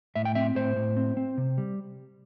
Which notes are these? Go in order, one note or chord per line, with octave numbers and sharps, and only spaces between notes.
A2 E5
G5
C4 E5
A2 C5
A2
C4
C4
C3
G3